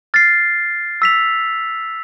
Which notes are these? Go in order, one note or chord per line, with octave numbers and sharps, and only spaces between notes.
F6 A6 C7
E6 B6 F7